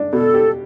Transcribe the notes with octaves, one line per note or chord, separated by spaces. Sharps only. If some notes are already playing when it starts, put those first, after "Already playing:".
Already playing: D4
B2 A4
G4